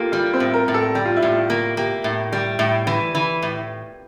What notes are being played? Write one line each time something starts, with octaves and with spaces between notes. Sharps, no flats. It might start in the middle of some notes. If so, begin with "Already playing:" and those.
Already playing: A#3 F4 G4 A4
G3 F4
C4
A2
A#4
A2
A4
G3 G4
F4
E4
A2 F4
A#3
A#3 G4
A2
G3
A2
E3
E3
A2